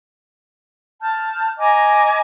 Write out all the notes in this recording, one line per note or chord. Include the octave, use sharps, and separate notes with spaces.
A5 F6 G6
D#5 G#5 A#5 D6